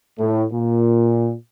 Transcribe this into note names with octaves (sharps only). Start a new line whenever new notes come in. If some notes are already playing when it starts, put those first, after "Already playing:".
A2
A#2